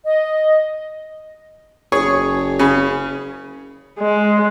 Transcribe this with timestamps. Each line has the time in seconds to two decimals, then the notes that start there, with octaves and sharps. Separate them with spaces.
0.05 D#5
1.92 F#1 G#4 C#5 C#6
2.59 C#3 G#5 B5
4.00 G#3